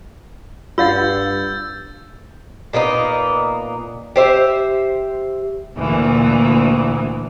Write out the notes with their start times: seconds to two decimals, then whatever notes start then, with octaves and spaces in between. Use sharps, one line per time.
0.78 G2 F4 F5 F#5 E6 G6 A6
2.73 A#2 A#3 B3 D#4
4.16 G4 C5 E5
5.77 D2 A#2 E3